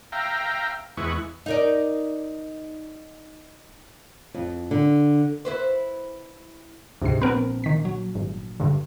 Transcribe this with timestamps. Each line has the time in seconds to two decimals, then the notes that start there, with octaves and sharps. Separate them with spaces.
0.12 E5 F5 G5 A#5
0.97 E2 G#3 E4 B4 C#6
1.46 D#4 A#4 D5
4.34 F2
4.71 D3
5.45 E4 B4 C5
7.02 D2 G#2 C3 C4 C7
7.22 A#1 B3 C4 A#4 B4
7.64 D#3 B6
7.85 F#3
8.15 G#1
8.60 G2 D3